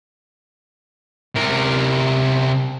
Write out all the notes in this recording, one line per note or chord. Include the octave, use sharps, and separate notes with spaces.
C3 A#4